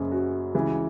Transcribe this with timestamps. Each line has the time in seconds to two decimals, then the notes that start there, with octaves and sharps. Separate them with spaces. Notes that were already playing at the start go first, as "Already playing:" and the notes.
Already playing: F#1 F#2 C#3 G#4
0.12 F#4
0.55 C#2 C#3 E3